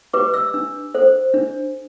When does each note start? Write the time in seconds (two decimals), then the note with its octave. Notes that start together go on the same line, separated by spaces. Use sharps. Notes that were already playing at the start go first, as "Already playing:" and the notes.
0.13 G4 B4 D6
0.34 E6
0.54 D4
0.95 A4 C5
1.34 D4